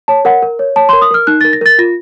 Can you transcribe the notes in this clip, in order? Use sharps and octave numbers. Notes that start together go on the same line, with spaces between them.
C#5 A5
A#4 F#5
A#4
C#5
C#5 A5
C6
A#4
D#6
A#4 F6
D#4 F#6
A6
A#4
A#6
A#4 A6
F4 A#6